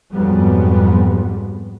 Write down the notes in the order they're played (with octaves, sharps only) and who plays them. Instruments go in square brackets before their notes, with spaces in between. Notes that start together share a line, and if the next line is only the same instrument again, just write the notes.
[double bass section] F2 G#2 F#3 G3 B3